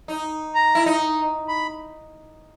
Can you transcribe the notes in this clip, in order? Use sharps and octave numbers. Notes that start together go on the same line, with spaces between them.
D#4
A#5
E4
D#4
B5